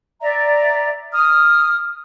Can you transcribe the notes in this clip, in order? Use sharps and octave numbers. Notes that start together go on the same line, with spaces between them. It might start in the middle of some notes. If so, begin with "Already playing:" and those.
D5 E5 A#5
D#6 F6